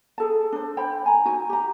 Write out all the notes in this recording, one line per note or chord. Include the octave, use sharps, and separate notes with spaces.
G#4 A4 A5
D4 C5
C5 G5 B5
G#5 A#5
D#4 F#4 G#5
G4 A#5